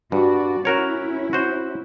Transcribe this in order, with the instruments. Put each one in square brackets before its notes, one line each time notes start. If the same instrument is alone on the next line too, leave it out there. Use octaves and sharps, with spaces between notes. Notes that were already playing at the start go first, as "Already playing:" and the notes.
[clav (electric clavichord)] G2 [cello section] F#4 D5
[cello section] C#4 E4 [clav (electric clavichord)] F#4 A#4 C#5
[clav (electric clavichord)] F#4 C5